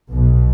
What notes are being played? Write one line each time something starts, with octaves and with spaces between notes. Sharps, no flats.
B1 B2